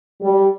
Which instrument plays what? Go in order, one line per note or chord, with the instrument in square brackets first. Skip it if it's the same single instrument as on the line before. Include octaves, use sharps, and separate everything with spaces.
[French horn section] G3